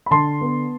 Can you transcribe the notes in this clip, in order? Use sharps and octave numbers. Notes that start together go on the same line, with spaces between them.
B5
D3 A5 C6
B3